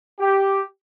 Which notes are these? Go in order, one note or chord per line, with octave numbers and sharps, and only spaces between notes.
G4